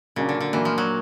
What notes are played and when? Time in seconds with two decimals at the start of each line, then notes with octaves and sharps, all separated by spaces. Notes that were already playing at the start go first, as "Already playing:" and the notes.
0.16 A#2 C#3 F#3 A#3 D4
0.29 D3
0.40 D3
0.53 A#2 E3 F#3 A#3 D4
0.65 F3
0.78 F#3